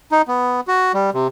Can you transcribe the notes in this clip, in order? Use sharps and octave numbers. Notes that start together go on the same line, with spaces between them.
D#4
B3
F#4
G3
C3